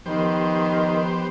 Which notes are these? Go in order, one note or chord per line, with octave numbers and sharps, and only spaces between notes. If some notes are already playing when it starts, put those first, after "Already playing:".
D#3 F3 B3 G4 C5